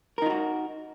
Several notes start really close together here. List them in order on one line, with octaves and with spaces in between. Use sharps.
A#4 D#4 F4 F#4